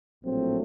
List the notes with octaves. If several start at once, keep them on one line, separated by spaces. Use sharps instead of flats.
A#1 A2 F#3 A3 C4